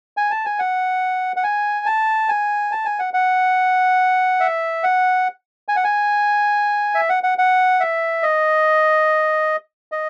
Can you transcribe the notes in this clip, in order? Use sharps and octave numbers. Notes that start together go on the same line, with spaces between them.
G#5
A5
G#5
F#5
F#5
G#5
A5
G#5
A5
G#5
F#5
F#5
E5
F#5
G#5
F#5
G#5
E5
F#5
F#5
F#5
E5
D#5
D#5